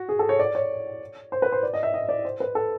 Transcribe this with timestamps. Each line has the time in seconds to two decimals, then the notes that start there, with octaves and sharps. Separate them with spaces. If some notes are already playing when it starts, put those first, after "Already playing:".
Already playing: F#4
0.09 G#4
0.19 A4
0.29 C#5
0.39 D5
0.55 C#5
1.32 C5
1.42 B4
1.52 C5
1.63 D5
1.74 D#5
1.83 E5
1.94 D#5
2.09 D5
2.25 C5
2.40 B4
2.55 A4